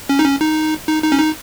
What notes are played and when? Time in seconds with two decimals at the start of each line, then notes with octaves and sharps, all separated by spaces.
0.09 C#4
0.19 D#4
0.25 C#4
0.41 D#4
0.88 D#4
1.04 D#4
1.12 C#4
1.19 D#4